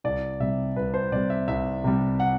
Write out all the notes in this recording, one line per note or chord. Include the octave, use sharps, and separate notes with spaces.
C2 D5
C3 G3 E5
C2 B4
C5
C3 G3 D5
E5
C2 E5
C3 G3
F#5